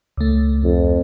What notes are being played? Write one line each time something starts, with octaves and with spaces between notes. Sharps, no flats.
C#2 A3
F2